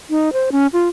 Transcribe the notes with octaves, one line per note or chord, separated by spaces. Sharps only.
D#4
C5
C#4
F4